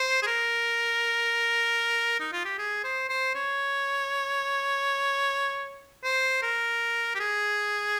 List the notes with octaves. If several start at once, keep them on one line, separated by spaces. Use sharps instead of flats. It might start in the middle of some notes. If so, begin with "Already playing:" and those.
Already playing: C5
G#4
A#4
D#4
F4
G4
G#4
C5
C5
C#5
C5
A#4
G4
G#4